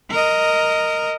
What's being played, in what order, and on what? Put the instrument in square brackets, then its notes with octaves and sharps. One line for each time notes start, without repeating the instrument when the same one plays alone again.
[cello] A#4 D#5